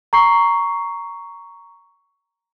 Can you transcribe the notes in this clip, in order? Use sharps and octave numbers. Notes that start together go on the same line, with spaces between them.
A#5 C#6 C7